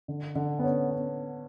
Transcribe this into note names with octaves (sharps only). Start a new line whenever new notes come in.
D3
D3
B3
C#4
B3